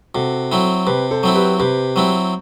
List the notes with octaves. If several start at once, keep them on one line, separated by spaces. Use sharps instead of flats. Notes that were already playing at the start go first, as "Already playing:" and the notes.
C3 F#4 A4
F#3 C4 E4
C3 G4 B4
A4 C5
F#3 C4 E4
G4 B4
C3 G4 B4
F#3 C4 E4